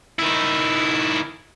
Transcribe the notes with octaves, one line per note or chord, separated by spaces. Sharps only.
D#3 E4